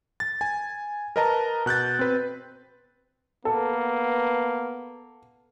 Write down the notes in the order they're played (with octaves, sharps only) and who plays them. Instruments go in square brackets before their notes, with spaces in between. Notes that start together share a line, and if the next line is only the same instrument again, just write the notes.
[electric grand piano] A6
G#5
A#4 B4 D#5 A5 A#5
B2 F#6 G6 A6
C4 B4
[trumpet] A#3 [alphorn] B3 [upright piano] A4